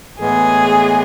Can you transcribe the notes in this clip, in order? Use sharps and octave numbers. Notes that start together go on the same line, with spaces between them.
A2 E3 G#3 B3 G#4